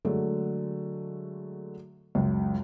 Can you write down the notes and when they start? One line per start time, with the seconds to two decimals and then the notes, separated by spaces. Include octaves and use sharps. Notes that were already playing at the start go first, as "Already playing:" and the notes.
0.05 D3 F#3 G#3 A3
2.15 C#2 F#2